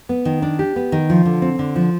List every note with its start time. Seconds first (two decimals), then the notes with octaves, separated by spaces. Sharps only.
0.09 B3
0.25 D#3
0.42 D4
0.59 G4
0.76 B3
0.92 D#3
1.10 F3
1.25 D3
1.42 C4
1.59 D3
1.76 F3